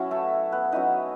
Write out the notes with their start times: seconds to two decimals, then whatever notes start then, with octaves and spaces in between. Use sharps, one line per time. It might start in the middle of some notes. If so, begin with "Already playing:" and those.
Already playing: F#3 B3 C#4 E4 F#4
0.11 A3 A4
0.52 B3 B4
0.72 F#3 C#4 D#4 E4 D#5